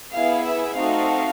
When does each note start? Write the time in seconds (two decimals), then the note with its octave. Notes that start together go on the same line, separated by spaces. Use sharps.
0.12 B3 E4 G#4 F5
0.44 E5
0.76 A3 C4 D#4 F#4 A4 F5